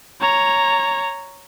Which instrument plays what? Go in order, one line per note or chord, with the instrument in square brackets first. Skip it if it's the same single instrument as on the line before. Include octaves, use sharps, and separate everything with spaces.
[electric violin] C#5 A#5